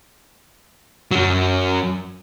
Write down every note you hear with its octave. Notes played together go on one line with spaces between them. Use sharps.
F#2 F#3